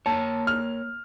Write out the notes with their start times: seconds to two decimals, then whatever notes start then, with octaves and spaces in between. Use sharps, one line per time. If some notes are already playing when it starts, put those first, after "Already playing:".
0.06 A#3 C#5 A5
0.47 F6